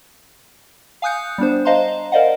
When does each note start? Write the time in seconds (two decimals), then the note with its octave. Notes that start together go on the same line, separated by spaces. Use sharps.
1.02 F5 G#5 D#6 F#6 G6 C#7
1.38 G3 B3 D4 C5
1.65 C5 D#5 F5 A5 A#5 C6
2.12 A#4 C5 D5 D#5 F5 F#5